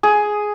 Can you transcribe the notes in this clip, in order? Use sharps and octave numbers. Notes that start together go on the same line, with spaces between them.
G#4